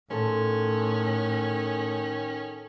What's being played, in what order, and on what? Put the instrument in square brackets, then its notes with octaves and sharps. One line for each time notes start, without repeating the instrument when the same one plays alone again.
[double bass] A2 [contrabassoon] D#3 [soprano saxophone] C#4 [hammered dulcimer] A4 C5